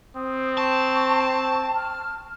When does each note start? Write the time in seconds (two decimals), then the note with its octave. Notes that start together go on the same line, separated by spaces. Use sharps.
0.15 C4 D#6
0.58 A5 C#6
1.17 C#6
1.76 F6